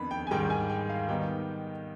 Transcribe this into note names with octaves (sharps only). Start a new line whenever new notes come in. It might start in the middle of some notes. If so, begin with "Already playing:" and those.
Already playing: F2 D#3 B3 D4 B5
G5
G#5
G#2 D#3 G3 G5
G#5
G5
F5
D#3 G3 B3 D#4 G5